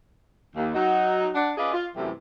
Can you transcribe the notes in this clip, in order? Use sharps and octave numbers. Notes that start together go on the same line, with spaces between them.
D#2
F#3 D#4 F#4
D4 F#5
C#4 F4 G#4 B4 D5 D#5
F4
F#2 A2 C3 E3 G3